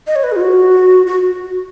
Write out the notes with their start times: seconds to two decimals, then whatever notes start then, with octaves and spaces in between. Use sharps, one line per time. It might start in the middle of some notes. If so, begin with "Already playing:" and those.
0.07 D#5
0.16 C#5
0.24 B4
0.32 G#4
0.36 F4
0.41 F#4
1.07 F#4